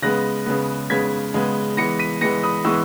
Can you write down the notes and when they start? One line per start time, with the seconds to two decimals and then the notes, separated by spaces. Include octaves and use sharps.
0.02 C#3 G#3 B3 F#6 A#6
0.46 C#3 G#3 B3
0.90 C#3 G#3 B3 G#6 B6
1.34 C#3 G#3 B3
1.77 E3 G#3 B3 A#6 C#7
1.99 B6 D#7
2.21 E3 G#3 B3 A#6 C#7
2.43 B5 D#6
2.64 E3 G#3 B3 C#6 E6